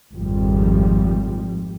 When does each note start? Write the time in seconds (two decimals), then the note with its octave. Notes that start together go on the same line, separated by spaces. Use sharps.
0.14 G#1 F2 F3 G3